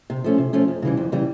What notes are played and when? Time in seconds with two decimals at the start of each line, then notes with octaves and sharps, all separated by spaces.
0.10 C3
0.24 F3 A3 C#4
0.38 C3
0.53 F3 A3 C#4
0.68 F2
0.82 C#3 E3 G3
0.97 F2
1.12 C#3 E3 G3